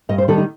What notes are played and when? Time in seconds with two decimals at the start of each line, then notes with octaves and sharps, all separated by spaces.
0.09 G2 D#5
0.18 C5
0.28 D#3 G3 A4
0.38 D#4